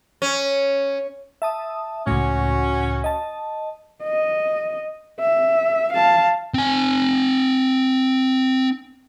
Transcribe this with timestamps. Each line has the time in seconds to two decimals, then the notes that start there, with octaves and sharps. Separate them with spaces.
0.22 C#4
1.42 E5 A5 D#6
2.07 C#2 A2 C#4 F#4
3.04 D#5 A5
4.03 D#5
5.20 E5
5.93 F5 A5
6.54 C4 G#5